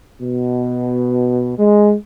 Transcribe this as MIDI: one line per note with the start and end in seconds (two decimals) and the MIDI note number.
0.21 1.53 47
1.58 1.94 56